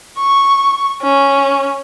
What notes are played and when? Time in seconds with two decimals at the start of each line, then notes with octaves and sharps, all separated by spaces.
0.18 C#6
1.02 C#4